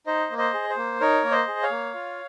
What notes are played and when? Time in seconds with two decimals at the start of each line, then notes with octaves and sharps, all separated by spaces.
0.07 D#4 C5 D#5
0.30 A#3
0.38 C5 D#5
0.54 G#4
0.69 C5
0.77 A#3
1.00 D#4 A#4 C#5
1.24 A#3
1.31 C5 D#5
1.48 G#4
1.63 C#5 F5
1.71 A#3
1.94 F4